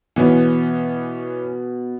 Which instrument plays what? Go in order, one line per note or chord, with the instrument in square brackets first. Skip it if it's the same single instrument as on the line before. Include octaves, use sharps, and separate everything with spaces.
[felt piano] B2 [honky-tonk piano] E3 B3 C#4